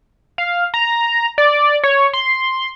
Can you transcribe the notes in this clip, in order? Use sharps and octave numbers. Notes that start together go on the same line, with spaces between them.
F5
A#5
D5
C#5
C6